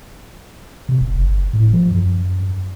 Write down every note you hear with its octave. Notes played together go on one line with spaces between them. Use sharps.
C3
E1
G1
A2
F3
F#2